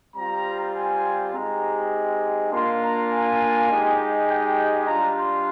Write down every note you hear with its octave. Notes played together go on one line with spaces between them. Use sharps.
G3 C4 F4 A#5
G#5
G#3 C4 D#4 G4 A#5
A#3 D4 F4 C6
A#5
G#5
G#3 D#4 G4
G5
G3 D4 F4 A#5
C6